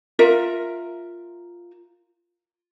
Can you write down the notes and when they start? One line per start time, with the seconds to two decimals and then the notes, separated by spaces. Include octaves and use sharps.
0.19 F4 A#4 E5